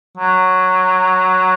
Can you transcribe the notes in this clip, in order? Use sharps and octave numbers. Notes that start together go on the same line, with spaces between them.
F#3